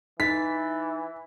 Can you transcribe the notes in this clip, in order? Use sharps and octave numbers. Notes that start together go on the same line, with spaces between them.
E3 D#4 A6 B6